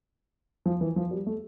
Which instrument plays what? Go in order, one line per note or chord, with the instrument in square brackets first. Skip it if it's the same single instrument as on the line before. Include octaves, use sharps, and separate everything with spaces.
[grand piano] F3
E3
F3
G3
A3